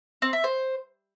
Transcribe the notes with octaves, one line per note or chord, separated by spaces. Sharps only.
C4
E5
C5